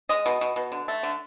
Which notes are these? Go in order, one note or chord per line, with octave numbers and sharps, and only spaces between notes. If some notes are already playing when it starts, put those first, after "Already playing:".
G#3 D#5
B2
B2
B2
D3
A3
D3